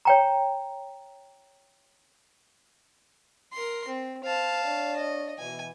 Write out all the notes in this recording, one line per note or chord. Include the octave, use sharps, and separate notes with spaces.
C#5 G5 A#5
A#4 C6
C4
C5 F5 A5
D4 C#5 D5
D#5
B2 E3 G#5